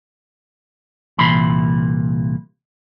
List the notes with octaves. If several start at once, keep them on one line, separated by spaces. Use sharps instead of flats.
C2 A#2 E3 B5 C6